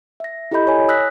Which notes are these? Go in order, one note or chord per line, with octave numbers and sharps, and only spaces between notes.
E5 A#6
E4 G4 A4 D#5 B5 G6
C#5 G#5
D#6 E6 F#6 A#6 B6